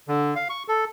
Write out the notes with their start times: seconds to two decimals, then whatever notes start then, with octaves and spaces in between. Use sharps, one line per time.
0.08 D3
0.36 F5
0.50 C#6
0.68 A4